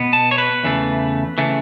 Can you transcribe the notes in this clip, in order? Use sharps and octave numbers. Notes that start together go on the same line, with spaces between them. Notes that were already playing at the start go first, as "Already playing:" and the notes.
Already playing: B2 B3
A5
C#5
B4
E2 C#3 E3 A3
C#3 E3 A3